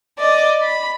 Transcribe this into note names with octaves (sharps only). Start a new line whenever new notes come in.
D5 D#5
B5